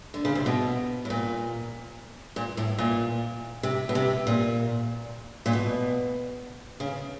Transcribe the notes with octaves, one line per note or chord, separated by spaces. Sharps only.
D3
C#3
C3
B2
A2
A#2
A#2
A2
A#2
C3
B2
C3
A#2
A#2
B2
C#3